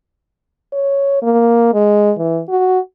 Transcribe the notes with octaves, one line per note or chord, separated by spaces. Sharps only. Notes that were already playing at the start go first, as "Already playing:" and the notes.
C#5
A#3
G#3
E3
F#4